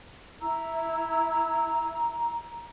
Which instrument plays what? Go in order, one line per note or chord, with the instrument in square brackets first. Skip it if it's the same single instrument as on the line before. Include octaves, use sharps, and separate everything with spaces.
[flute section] E4 E6 [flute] A#5